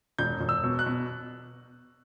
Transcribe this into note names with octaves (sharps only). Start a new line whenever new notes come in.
E1 G6
E1
E6
B2
F#6
B2